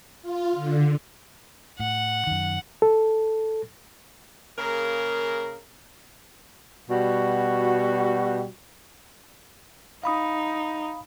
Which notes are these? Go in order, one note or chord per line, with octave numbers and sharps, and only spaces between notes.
F4
D3
A2 F#5
F#2 D#3
A4
C#3 A#3 G#4 A#4
B2 G3 F#4
D#4 F5 B5 D#6